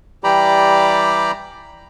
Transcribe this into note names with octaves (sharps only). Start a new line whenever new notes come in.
E3 G3 G4 D5 A#5 B5